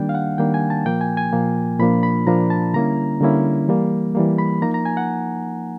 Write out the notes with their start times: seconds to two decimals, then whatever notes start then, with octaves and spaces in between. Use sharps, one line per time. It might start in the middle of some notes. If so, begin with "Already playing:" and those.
Already playing: D#3 G3 A#3 D4 G5
0.09 F5
0.15 F#5
0.38 D#3 G3 A#3 D4 G5
0.54 G#5
0.70 A5
0.85 A#2 F3 A#3 G5
1.01 G#5
1.17 G#5
1.32 A#2 F3 A#3
1.80 A#2 F3 A#3 D4 B5
2.03 B5
2.26 A#2 F3 A#3 D4 A#5
2.50 A5
2.74 D3 G3 A#3 C#4 E4 A#5
3.20 D3 G3 A#3 C#4 E4
3.68 E3 G3 A#3
4.15 E3 G3 A#3
4.38 B5
4.62 F3 A#3 D#4 A#5
4.74 A#5
4.85 G#5
4.97 F#5